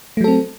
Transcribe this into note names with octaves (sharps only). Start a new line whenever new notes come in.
F#3 A3 C4 A4